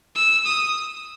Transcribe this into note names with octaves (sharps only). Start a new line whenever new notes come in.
E6
D#6